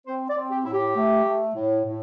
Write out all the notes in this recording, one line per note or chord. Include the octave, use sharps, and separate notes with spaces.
C4 C5
D5
C4
G4
A2 E4
G4
A3
A3
A2
A2